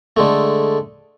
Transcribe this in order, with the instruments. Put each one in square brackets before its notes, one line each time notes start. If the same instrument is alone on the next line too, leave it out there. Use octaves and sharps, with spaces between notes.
[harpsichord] D3 G#3 A3